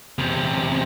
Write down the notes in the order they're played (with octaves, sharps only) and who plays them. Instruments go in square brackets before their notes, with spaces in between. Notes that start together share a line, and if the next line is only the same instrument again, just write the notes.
[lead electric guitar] E2 C3